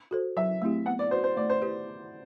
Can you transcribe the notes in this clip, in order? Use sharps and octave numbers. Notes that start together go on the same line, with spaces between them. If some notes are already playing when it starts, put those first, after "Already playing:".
F#4 A4 C5
F#3 E5
A3 C4 E4 G4
B3 F#5
D5
F#4 B4 C5
C5
A3 D5
C5
E4 G4 B4 D5